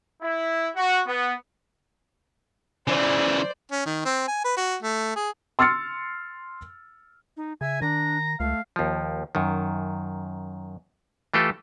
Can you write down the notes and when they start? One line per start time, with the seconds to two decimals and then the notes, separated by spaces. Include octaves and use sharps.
0.22 E4
0.76 F#4
1.06 B3
2.87 C#3 E3 C5 D5
3.71 C#4
3.85 D#3
4.05 C4
4.27 G#5
4.44 B4
4.56 F#4
4.82 A3
5.16 G#4
5.59 C6 E6 F6 A6 C#7
7.37 D#4
7.61 C#3 E5 G#5
7.82 D#3 D4 A#5
8.40 C#2 A3 F5
8.76 D#2 F3
9.35 F#2 D#3
11.34 E3 A3 F4 G4 A4